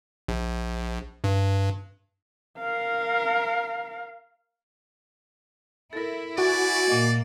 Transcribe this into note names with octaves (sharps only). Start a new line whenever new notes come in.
A#1
G2
A#4 F5
E4 A4 A#4
F#4 D5 G#5
A#2 A#3 D#5